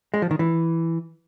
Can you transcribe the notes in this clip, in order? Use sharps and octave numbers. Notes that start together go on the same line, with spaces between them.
G#3
F3
D#3
E3